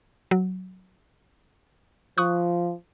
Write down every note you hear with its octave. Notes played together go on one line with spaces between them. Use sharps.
F#3
F3 C#6 D#6 F#6